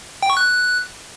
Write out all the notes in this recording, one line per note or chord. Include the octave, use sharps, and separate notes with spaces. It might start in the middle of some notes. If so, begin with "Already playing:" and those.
G5
C#6
F#6